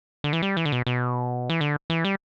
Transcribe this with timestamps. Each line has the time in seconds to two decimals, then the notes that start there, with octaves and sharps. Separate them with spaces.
0.24 D3
0.33 E3
0.42 G3
0.57 E3
0.66 D3
0.72 B2
0.87 B2
1.50 E3
1.61 D3
1.90 E3
2.05 G3